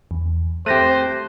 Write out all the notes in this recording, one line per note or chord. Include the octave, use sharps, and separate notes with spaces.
E2
A3 C4 G4 C5 F#6 A#6 D#7